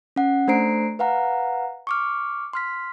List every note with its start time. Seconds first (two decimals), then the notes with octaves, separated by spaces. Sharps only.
0.16 C#4 F#5
0.48 A3 D4 C5 A#5 C7 D7
0.99 B4 F5 F#5 A#5
1.87 C#6 D6 F6
2.53 C6 F6 B6